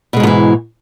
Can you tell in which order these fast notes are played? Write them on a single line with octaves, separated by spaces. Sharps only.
B2 G#3 G#2 F3 E3